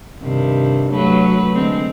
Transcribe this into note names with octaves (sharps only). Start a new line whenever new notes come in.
G2 C3 D#3
F#3 A3 B4
D3 G#3 C4